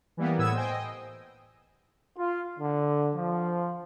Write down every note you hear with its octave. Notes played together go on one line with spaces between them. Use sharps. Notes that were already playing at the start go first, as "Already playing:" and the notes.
E3 G3 A#3 B3
A2 B3 D#6 E6 G#6
C5 D#5 G5 G#5
D#5
F4
D3
F3